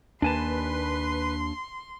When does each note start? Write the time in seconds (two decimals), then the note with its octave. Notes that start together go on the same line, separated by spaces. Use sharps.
0.22 D#2 A#3 D4 B4 G#5 A5 C6